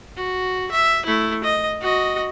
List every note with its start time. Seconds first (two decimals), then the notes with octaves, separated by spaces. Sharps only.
0.16 F#4
0.71 E5
1.06 A3 E4
1.43 D#5
1.81 F#4 D#5